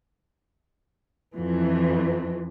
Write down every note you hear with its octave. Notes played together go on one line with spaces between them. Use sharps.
F2 E3